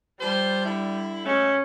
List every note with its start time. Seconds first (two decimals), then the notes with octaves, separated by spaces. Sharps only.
0.21 F3 G3 C5
0.65 D3 E4
1.26 B2 G#3 A3 C#4